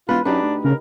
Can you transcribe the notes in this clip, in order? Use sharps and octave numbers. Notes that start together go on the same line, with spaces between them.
E1 F4 B4
F#2 D4 D#4 G4 B4
D2
C#3 A#4